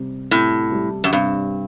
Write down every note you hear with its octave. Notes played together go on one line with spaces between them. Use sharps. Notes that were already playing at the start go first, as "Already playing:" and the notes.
Already playing: C3 G3
A2 C3
G3
F#2
G2 C3